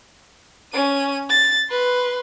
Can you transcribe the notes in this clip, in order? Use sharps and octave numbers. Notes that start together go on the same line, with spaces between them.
C#4 D#7
A6
B4 C6